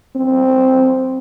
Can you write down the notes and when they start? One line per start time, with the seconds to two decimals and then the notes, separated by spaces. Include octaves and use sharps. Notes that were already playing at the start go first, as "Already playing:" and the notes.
0.16 C4